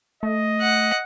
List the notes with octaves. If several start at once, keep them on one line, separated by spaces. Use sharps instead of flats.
A3 D#5
F#5